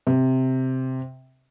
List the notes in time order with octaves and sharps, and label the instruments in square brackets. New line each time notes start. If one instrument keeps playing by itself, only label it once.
[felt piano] C3